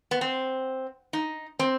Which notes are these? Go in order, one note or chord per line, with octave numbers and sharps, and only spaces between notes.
B3
C4
D#4
C4